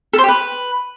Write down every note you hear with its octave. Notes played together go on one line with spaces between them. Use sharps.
A4
C5
G4
B4